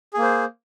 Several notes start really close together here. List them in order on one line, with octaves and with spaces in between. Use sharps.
G#4 A#3 C5